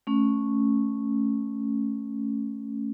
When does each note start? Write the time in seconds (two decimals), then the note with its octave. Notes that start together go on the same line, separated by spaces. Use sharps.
0.07 A3 C#4